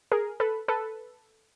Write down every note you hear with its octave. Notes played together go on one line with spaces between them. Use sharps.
G#4 A#4
A4 B4
A4 B4